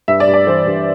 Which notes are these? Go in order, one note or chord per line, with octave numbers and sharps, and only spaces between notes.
G2 E5
D5
G2
D5
E3 C5
G2